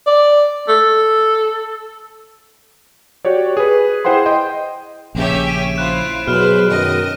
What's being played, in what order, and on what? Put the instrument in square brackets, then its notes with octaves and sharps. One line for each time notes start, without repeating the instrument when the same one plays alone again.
[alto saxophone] D5
A4
[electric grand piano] F#4 G4 C#5 D5
G#4 B4
E4 G#4 C5 F#5 G5 C6
D#5 G5 C6
[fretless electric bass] A#1 C#3 [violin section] C#4 G4 E5
[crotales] D7 D#7
[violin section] E4 F4 C5 [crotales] F#6 E7
[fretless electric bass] B2 [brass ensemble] F#3 G#4 [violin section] B4 C5 [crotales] F6
[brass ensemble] F#2 D#3 [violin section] D#5